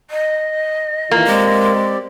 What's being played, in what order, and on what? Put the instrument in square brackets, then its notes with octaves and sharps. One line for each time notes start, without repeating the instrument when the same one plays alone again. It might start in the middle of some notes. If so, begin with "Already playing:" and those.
[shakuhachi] D#5
[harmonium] D#3 E3 F4 [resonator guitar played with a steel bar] A#3
[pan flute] G#3 [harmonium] C4 G4 D5